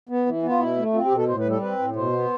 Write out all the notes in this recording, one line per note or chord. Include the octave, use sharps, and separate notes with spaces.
B3
E3
B3
F4
B2 E4
A3
C4 F4
G4
B2
A4
A2 C5
B4
G3
A4
C4 B4
A2
B2 C5
B3